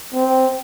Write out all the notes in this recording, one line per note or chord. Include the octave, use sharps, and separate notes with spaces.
C4